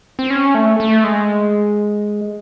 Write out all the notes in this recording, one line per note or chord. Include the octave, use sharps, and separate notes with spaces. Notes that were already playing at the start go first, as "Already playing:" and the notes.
C4
C#4
A3
A3
G#3